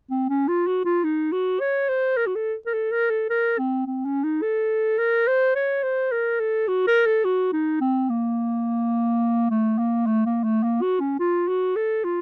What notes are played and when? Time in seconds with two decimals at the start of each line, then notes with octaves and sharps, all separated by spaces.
0.10 C4
0.29 C#4
0.48 F4
0.67 F#4
0.85 F4
1.04 D#4
1.32 F#4
1.60 C#5
1.89 C5
2.17 A#4
2.27 F#4
2.35 A4
2.66 A#4
2.74 A4
2.92 A#4
3.10 A4
3.30 A#4
3.59 C4
3.87 C4
4.05 C#4
4.24 D#4
4.42 A4
4.99 A#4
5.28 C5
5.55 C#5
5.83 C5
6.12 A#4
6.40 A4
6.68 F#4
6.87 A#4
7.06 A4
7.24 F#4
7.53 D#4
7.81 C4
8.10 A#3
9.50 A3
9.78 A#3
10.06 A3
10.26 A#3
10.44 A3
10.63 A#3
10.82 F#4
11.00 C#4
11.19 F4
11.48 F#4
11.76 A4
12.04 F4